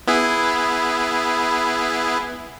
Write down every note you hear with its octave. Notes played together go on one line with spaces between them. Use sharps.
B3 E4 G#4